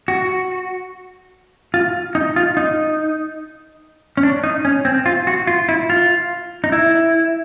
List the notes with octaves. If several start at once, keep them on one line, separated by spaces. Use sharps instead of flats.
F#4
F4
D#4
F4
D#4
C#4
D4
D#4
C#4
C4
F4
F#4
F4
E4
F4
D#4
E4